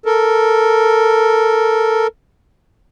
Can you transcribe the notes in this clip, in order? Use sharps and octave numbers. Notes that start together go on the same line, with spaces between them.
A4 A#4